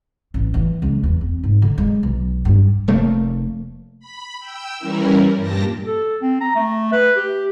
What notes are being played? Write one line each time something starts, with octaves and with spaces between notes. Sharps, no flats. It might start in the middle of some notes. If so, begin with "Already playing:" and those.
A1
E3
C#2
E2
C4
G#2
D3
G#3
B1
G2
F1 A3 A#3
B5
G5 E6
E3 G3 C#4 E4 A#4
G2 A#2 G4 A5 A#6
A4
C4
A#5
A3
B4
G4